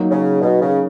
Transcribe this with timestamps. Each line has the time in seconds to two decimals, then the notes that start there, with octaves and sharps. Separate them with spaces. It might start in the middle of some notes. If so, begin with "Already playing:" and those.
Already playing: F#3 A#3 D#4
0.11 C#3
0.41 B2
0.61 C#3